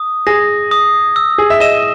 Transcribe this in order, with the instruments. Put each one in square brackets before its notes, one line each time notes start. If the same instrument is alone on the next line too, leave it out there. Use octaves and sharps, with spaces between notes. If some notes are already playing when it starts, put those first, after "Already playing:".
Already playing: [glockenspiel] D#6
[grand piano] G#4 [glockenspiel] A#6
[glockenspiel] D#6
E6
[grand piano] G#4
E5
[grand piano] D#5 [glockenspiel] E7